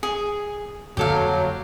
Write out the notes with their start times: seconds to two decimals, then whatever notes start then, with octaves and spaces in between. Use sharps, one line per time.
0.03 G#4
0.97 F2 D3 F#3 A#3 G4 A4 F5